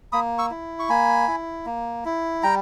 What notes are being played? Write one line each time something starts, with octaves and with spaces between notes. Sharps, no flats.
A#3 B5 D#6
C#6 E6
E4
C#6
A#3 G#5 B5
E4
A#3
E4
G3 G5 A#5